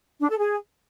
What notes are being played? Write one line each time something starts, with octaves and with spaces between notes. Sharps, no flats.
D4
A4
G#4